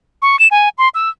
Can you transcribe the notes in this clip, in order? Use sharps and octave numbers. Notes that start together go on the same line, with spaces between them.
C#6
E7
G#5
C6
E6